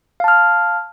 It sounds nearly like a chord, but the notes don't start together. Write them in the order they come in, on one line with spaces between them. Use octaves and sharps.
F5 A5 F6